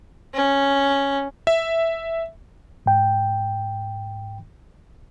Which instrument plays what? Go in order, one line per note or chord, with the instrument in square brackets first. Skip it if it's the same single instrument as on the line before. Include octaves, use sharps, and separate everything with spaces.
[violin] C#4
[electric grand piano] E5
[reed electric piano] G#2 G5